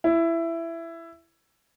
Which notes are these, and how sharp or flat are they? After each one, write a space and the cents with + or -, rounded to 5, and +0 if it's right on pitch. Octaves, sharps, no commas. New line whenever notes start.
E4 +15